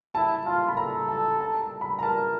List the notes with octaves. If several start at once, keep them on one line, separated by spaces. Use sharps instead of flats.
E4 A5
F4 A5
B5
A4 A#5
A5
A5
A#5
B5
A#5
A#4 A5